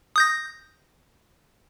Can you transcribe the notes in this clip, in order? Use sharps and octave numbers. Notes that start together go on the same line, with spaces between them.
D#6 G6 A#6